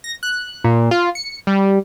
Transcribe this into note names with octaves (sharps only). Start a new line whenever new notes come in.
A#6
F#6
A#2
F4
C#7
G3